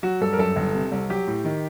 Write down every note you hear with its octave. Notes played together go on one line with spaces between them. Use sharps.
F#3 F#4
G2 A4
A#4
F#2 A4
G1
C3
C2
F#3 G4
A2
D#3